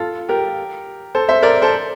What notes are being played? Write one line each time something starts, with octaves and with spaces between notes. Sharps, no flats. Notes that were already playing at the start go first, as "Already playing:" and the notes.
Already playing: F4 A4
G4 A#4
A4 C5
C5 E5
A#4 D5
A4 C5